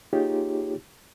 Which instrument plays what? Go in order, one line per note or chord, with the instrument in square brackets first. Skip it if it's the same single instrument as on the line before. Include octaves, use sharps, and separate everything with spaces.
[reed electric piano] A#3 D#4 F4 G4 G#4 C#5